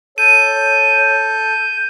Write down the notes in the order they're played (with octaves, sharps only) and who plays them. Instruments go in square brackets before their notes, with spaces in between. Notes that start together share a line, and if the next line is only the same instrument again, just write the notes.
[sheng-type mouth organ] A4 [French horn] C#5 [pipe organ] G6 [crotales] D#7